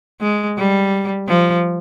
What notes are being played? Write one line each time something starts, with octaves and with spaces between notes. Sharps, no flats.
G#3
G3
F3